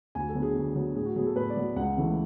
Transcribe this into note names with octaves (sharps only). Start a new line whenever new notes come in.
D2 G#5
A4
D3 F#3 B3
G#4
D2
D3 F#3 B3
A2 G#4
F#4
F#3 B3 G#4
A4
A2 B4
D5
F#3 B3
C#2 F#5
C#3 E3 A3